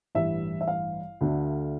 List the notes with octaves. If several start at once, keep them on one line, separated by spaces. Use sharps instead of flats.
A1 G2 E3 G3 E5
E5
F5
D2 D3 A3